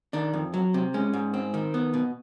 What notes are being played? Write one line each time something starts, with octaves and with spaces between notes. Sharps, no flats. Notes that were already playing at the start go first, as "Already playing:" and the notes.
D#3 D4
F2
F#3
C3
G#3 C#4
G#2
C4
D#3
B3
B2